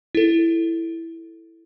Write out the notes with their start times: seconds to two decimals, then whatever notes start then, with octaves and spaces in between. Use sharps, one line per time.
0.15 E4 A4